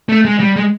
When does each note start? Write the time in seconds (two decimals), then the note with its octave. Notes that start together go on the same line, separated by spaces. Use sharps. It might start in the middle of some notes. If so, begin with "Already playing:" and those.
0.09 A3
0.25 G#3
0.40 G3
0.57 G#3